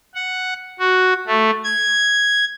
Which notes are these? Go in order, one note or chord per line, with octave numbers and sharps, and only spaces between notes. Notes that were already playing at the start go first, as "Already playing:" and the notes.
F#5
F#4
A3
G#6